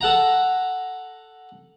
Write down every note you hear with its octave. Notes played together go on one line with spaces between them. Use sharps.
A4 F#5 A#5